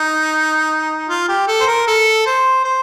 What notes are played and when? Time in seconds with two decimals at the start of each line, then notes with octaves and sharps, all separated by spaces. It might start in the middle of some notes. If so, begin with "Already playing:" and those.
Already playing: D#4
1.09 F4
1.29 G4
1.48 A4
1.60 C5
1.67 A#4
1.88 A4
2.26 C5
2.65 C5